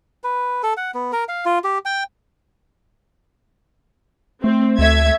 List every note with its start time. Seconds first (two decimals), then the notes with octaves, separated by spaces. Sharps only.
0.24 B4
0.63 A4
0.77 F#5
0.94 B3
1.12 A#4
1.28 F5
1.46 F4
1.64 G4
1.85 G5
4.44 A3 C4
4.79 D2 A3 E5 G#6